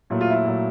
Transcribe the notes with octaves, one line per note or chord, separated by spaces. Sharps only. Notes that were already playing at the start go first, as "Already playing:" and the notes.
A#2 F#3 A3 E4
F4
E4
A#2 F#3 A3